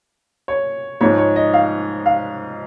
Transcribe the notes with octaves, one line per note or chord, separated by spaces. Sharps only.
C#5
G#2 F3 G#3 C#5
C#5
D#5
F5
F5